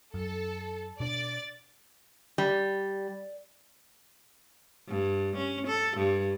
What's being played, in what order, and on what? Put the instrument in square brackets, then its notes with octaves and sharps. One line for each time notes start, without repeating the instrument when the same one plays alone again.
[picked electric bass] F#2 [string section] A4
[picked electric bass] B2 D4 [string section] D5 A6
[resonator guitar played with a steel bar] G3
[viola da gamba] G2
C#4
A4
G2